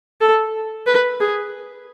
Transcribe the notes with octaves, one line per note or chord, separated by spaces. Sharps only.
A4
B4
G#4